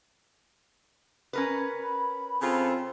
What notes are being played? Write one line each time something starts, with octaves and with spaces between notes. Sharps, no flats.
C#4 A#4 B4
B5
C#3 C4 F4 A4